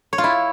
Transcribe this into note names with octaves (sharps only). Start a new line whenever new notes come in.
C#5
F4
E4